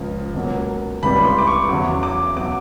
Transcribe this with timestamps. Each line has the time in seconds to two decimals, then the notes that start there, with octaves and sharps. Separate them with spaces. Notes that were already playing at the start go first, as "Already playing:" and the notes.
Already playing: C#2 C#3 F3
0.34 C#2 B2 F#3 A#3
1.03 C#2 C3 E3 G3 B3 B5
1.25 C6
1.38 D6
1.47 C#6
1.69 E2 C#3 F#3 D6
2.03 D6
2.37 B2 F#3 D6